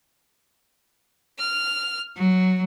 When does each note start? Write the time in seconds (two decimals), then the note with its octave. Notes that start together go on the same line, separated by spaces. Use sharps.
1.39 F6
2.16 F#3